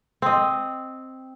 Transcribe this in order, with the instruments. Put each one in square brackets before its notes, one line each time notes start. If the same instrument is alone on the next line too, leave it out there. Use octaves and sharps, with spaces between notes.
[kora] C4 D#5